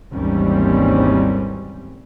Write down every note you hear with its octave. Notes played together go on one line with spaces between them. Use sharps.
G#1 D#2 E3 G3 C4 C#4